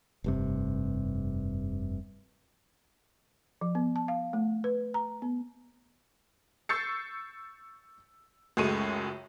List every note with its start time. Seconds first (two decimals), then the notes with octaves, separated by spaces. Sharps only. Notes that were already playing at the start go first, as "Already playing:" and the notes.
0.24 F1 G2 C3
3.61 F3
3.75 B3
3.96 A5
4.08 F5
4.33 A3
4.64 B4
4.94 A#5
5.22 B3
6.69 C#6 E6 G6 A6 C7 C#7
8.57 C#2 F#2 G#3 A3 C#6 D#7